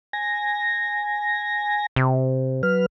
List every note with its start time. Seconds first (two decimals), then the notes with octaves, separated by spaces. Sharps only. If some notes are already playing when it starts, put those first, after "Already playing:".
0.13 G#5 A#6
1.96 C3
2.63 F#3 B4 F6